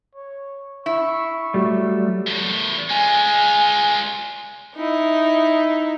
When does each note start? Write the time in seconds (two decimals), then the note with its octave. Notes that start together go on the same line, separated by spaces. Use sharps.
0.15 C#5
0.86 E4 C#6
1.54 F#3 G3 A3
2.27 E2 A2
2.90 G#3 F4 G#5
4.75 D#4 E4